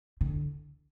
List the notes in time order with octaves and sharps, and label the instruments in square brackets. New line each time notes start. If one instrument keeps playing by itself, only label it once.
[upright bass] D3